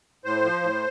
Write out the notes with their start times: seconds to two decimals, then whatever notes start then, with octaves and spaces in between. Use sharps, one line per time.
0.25 A2 C5
0.44 F3
0.63 A2